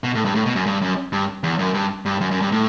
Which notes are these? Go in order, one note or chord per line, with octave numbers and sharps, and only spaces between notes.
B2
A2
G2
A2
B2
F#2
G2
F#2
G2
E2
F#2
G2
G2
F#2
F#2
G2
A2